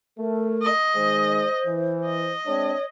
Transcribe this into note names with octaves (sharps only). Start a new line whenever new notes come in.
A3 A#4
D#5
D#3 G#3 C5
E3
D#5
G#3 C4 D4 C#5